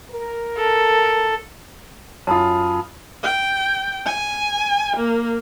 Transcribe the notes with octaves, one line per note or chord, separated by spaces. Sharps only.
A#4
A4
F#2 F4 A5 B5 D#6
G5
G#5
A#3